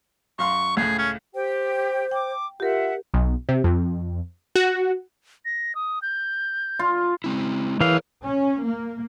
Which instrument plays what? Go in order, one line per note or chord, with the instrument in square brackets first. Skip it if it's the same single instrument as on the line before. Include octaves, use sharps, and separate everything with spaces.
[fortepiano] F#2 F5 C6 [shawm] C#6
[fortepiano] C#2 A2 [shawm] G#4
[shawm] C#4
[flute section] G4 G5 [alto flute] C5
[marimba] G5 [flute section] D6
[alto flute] F4 [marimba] G4 A#4 [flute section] E5 F#5
[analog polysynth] B1
C3
F2
F#4
[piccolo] A#6
D#6
G6
[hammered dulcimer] F4
[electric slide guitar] G#3 C4 E4
[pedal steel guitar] E3 F5 [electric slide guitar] G#4 A#4 C#5
[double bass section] C#4
A#3